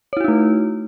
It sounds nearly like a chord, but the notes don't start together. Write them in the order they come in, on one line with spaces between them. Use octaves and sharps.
C#5 E4 F#4 D#4 A3